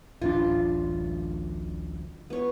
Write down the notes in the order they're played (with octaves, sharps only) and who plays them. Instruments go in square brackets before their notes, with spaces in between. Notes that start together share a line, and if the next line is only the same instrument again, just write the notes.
[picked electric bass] D1 A1 D4 [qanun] F4
[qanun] B3 C#5